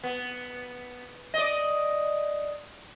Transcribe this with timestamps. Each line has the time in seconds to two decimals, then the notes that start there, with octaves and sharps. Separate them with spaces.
0.04 B3
1.34 D5 D#5